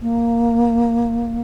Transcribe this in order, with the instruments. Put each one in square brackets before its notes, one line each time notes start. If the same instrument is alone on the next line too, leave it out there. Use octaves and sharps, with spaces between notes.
[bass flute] A#3